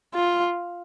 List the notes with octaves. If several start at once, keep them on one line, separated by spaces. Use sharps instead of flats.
F4